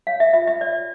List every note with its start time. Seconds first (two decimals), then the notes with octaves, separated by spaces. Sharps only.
0.07 C#5 F5
0.20 E5
0.33 F4 E5
0.47 E5
0.61 C#5 D5